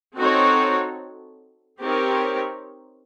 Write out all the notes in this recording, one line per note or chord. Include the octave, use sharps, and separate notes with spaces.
C4 D#4 F#4 A4 C#5
C4 D#4 G4 A#4 C#5